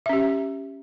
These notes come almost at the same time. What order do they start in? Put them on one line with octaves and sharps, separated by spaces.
E5 C#4 G4